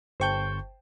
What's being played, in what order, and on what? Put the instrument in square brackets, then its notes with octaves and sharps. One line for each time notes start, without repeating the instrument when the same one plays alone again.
[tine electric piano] G1 C#6 G6 [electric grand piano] C5 G5 A5